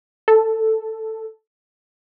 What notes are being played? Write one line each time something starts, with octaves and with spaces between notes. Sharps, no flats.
A4